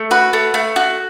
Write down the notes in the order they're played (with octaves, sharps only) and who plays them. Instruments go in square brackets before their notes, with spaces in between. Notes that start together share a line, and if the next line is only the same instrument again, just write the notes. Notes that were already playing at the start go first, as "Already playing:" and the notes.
Already playing: [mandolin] A3
F#4 B4
A3
A3
F#4